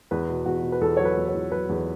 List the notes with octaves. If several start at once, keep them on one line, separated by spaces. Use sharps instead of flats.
E2 B4
B2
E2 F#4
B2
B4
E2 A4
F#3 C#5
B4
E2
C#5
E2
F#3 B4
E2